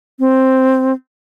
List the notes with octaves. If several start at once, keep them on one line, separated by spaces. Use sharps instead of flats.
C4